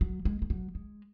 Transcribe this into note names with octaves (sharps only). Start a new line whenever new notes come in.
F#3
G#3
G#3
F#3
G#3